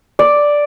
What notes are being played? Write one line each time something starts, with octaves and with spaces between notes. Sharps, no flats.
D5